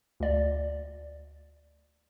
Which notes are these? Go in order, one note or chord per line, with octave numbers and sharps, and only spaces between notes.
D2 D5